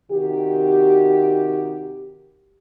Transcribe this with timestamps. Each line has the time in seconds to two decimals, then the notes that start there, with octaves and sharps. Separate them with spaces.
0.11 C3 D#3 F#4 G4